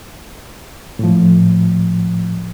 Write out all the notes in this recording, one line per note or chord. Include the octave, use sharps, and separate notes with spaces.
A2 F3